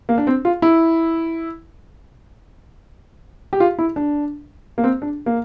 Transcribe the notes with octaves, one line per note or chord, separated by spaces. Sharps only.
A#3
D4
C4
F4
E4
G4
F4
E4
D4
A#3
C4
D4
A#3